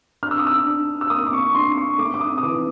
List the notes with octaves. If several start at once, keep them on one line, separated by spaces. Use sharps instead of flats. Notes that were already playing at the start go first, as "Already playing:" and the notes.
D4 F6
E6
D#6
E6
D4
E6
A#3 D#6
D6
C#6
D4 C6
C#6
A3 D6
D6
D#6
D#6
E3 D6